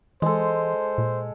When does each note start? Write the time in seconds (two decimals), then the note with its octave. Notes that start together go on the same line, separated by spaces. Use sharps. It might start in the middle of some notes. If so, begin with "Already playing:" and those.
0.22 E3 G#3 A4 C5
0.98 A#2